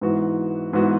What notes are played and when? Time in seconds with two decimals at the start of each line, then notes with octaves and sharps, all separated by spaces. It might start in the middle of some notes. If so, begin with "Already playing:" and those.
0.01 G#2 E3 B3 F#4
0.73 G#2 E3 B3 F#4